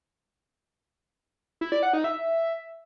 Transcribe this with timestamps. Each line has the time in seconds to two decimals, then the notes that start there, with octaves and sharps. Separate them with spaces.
1.61 E4
1.72 D5
1.83 F#5
1.93 D#4
2.04 E5